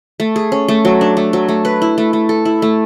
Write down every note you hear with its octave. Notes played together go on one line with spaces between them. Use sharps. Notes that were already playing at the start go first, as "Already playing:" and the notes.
A3
G#4
C#4
A3
F#3
D4
A3
F#3
A3
B4
E4
A3
A3
A4
E4
A3